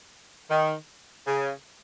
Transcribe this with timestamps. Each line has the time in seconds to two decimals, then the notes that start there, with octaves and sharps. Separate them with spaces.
0.50 D#3
1.27 C#3